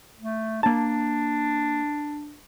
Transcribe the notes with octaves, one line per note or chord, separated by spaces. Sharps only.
A3
A#3 D4 A5